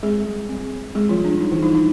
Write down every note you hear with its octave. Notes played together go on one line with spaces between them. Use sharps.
G#3 C4 G#4
G3
C4
C4
G#3 C4 G#4
F3 F4
G3
D4
G3 D#4
E3 E4
G3 D#4
D#4